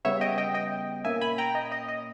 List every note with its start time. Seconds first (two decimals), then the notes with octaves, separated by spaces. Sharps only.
0.05 C#3 G3 B3 C#5 E5
0.21 D#5 G5
0.38 D#5 G5
0.54 D#5 G5
1.04 A#2 A#3 C#4 E5 G#5
1.21 G#5 B5
1.38 G5 A#5
1.55 D#5
1.72 D#5
1.88 D#5